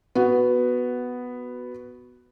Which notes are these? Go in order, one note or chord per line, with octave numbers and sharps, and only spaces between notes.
B3 F#4